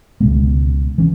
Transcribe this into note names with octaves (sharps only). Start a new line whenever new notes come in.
C#2 B2 G#3 B3
E3 C#4